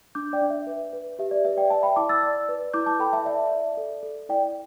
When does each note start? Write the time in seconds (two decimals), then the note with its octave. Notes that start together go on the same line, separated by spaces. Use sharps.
0.15 D4 D6 G6
0.33 D5 G5
0.42 D4
0.50 E5
0.67 B4
0.93 B4
1.19 G4 E5
1.31 D5
1.45 B4 E5
1.57 D5 G5
1.70 D5 E5 A5
1.83 G5 B5
1.96 E4 A5 D6
2.09 E6 A6
2.23 D5
2.49 B4
2.74 E4 D6 G6
2.86 A5 D6
2.99 A4 G5 B5
3.13 E5 A5
3.25 D5 E5
3.52 D5
3.77 A4
4.03 A4
4.29 E4 D5 G5